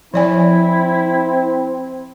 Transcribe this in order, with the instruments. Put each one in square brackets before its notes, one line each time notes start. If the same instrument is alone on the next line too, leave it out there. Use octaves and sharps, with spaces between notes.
[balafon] F3 D5 G#5 [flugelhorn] C4 [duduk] E4